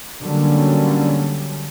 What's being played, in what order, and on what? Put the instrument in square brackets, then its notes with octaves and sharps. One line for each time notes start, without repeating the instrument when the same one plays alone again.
[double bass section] D3 F#3 G3 A#3 C#4